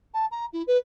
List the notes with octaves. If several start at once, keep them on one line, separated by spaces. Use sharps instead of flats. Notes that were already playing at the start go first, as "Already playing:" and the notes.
A5
A#5
E4
B4